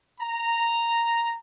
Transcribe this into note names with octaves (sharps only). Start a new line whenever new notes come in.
A#5